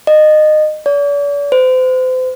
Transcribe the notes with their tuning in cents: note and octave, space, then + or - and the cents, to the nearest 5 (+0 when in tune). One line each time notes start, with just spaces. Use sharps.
D#5 -20
D5 -45
C5 -35